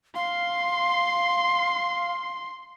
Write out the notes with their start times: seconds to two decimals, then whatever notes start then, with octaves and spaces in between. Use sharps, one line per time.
0.15 F5 C6